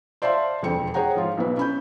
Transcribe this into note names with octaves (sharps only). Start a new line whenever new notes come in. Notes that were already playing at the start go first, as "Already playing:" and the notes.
C5 D5 E5 F5 A5 C6
E1 F2 D3 C4 G5 C#7
G#4 C#5 F#5 G5 A#5
G#2 F3 F4
B1 B2 E4 B4
C#4 B5 G6